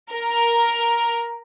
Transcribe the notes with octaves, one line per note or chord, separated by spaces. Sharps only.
A#4